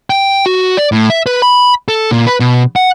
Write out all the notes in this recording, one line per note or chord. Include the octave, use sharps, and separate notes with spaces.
G5
F#4
D5
A2
E5
B4
B5
A4
A#2
B4
B2
F#5